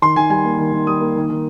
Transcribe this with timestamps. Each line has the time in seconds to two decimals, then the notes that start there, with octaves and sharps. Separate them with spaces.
0.02 D#3 C6
0.16 D#3 G#5
0.30 G3 G#5
0.44 A#3
0.58 D#3
0.73 D#3
0.87 G3 D#6
1.01 A#3
1.16 D#3
1.30 D#3